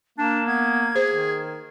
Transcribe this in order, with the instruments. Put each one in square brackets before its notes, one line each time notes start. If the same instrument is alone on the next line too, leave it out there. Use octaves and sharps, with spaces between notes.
[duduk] A#3 [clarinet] D4 [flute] A5
[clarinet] B3 [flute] G#6
[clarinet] G#4 [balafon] C5
[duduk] D#3